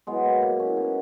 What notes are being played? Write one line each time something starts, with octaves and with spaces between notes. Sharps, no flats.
B2 F#3 G#3 B3
A#3
A#3
C#4 E4
B3 D#4